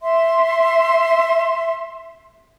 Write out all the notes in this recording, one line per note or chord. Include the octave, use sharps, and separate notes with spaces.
E5 C6